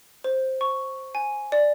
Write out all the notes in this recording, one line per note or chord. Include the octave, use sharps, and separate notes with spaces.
C5
C#6
G#5
D5